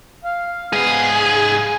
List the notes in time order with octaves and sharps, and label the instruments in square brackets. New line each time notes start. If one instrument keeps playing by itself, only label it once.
[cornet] F5
[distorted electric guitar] G#2 F5 [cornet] B3 [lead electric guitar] G#4
[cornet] G#5